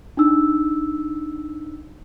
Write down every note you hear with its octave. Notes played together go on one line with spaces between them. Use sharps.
D4 D#4 E6